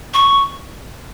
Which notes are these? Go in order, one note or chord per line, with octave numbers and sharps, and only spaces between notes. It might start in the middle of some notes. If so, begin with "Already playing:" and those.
C#6